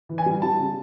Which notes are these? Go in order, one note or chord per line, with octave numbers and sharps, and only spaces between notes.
E3
G#5
G3
G3 A5
C#3